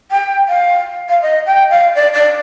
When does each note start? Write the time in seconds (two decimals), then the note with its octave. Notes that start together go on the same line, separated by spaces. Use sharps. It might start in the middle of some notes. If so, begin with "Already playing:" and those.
0.11 G5
0.49 F5
1.09 F5
1.22 D#5
1.46 G5
1.70 F5
1.95 D5
2.13 D5